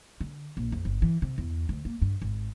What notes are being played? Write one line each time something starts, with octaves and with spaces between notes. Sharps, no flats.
D3
A#1
F2
G1
E3
C3
E2
D2
A#3
G2
G#1